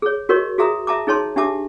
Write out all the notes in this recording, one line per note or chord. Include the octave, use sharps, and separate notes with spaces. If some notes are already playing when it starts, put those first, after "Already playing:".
G#4 C#5
F#4 A#4 C#5 D#5 C#6
F#4 G#4 E5 A#5 D#6
E5 A5 A#5 D6
D#4 G#4 C#5 A5 C6
D4 G4 E5 A5 D6